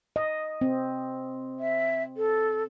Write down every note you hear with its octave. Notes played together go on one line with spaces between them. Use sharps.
D#5
C4
E5
A4